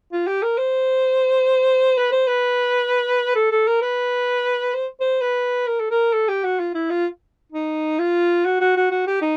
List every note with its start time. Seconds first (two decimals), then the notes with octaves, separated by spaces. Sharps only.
0.12 F4
0.27 G4
0.43 A#4
0.58 C5
1.98 B4
2.12 C5
2.28 B4
3.35 A4
3.51 A4
3.67 A#4
3.82 B4
4.74 C5
5.01 C5
5.22 B4
5.67 A#4
5.80 A4
5.91 A#4
6.13 A4
6.28 G4
6.44 F#4
6.59 F4
6.75 E4
6.90 F4
7.52 D#4
7.99 F4
8.45 F#4
8.61 F#4
8.76 F#4
8.91 F#4
9.07 G4
9.22 D#4